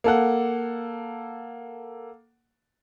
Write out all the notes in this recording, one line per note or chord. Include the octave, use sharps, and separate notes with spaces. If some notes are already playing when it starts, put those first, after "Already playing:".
A#3 A4 F#5